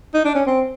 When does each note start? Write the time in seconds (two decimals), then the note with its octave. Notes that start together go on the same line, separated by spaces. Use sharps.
0.14 D#4
0.25 D4
0.35 C#4
0.47 C4